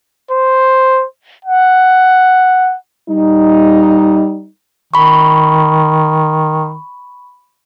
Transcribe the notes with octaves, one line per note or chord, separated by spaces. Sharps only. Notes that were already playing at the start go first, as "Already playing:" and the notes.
C5
F#5
G3 D#4
D#3 B5 C#6